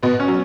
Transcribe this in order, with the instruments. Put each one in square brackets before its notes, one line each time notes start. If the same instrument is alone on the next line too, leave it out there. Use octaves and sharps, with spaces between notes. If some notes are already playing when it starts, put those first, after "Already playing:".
[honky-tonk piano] B2 [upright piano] B3
[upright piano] C#4
[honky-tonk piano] F#3